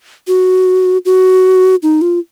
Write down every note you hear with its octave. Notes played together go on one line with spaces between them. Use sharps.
F#4
F#4
D#4
F4